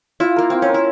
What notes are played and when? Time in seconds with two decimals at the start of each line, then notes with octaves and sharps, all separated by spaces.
0.20 E4 F4
0.36 A#3 A#4
0.50 C4 F4
0.62 C#4
0.69 A#4
0.74 E4